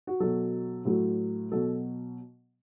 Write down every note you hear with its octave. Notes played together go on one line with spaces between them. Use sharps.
F#4
B2 F#3 A4
A2 F#3
B2 F#3 A4